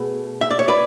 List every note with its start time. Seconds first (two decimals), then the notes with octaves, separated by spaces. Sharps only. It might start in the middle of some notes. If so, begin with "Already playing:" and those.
Already playing: B2 A3 G#4 B4
0.41 E5
0.51 D5
0.59 C#5
0.68 B4 D5